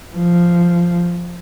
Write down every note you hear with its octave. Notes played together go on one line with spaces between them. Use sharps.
F3